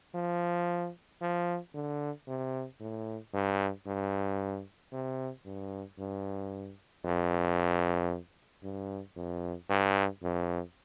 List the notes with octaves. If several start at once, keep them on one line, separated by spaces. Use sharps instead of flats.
F3
F3
D3
C3
A2
G2
G2
C3
G2
G2
F2
G2
F2
G2
F2